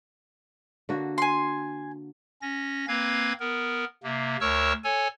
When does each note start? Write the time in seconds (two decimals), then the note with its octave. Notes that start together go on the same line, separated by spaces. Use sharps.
0.89 D3 A#3 F#4
1.18 G#5 C6
2.42 C#4 A#6
2.88 A#3 C4 B4 F5 G#6
3.40 B3 A#4
4.04 C3 A#3
4.41 D2 A#4 C#5 A5 C#6 E6
4.84 A4 C#5 G#5